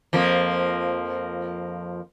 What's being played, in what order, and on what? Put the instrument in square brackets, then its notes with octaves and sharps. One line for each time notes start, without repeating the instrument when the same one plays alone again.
[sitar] F2 F3 A#3